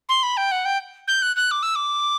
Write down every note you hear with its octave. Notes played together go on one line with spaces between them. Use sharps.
C6
B5
G5
F#5
G5
G6
F#6
F#6
D6
E6
D6